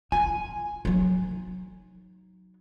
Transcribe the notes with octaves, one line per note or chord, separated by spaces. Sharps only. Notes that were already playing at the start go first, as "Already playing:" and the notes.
F4 G#5
F#3 D#4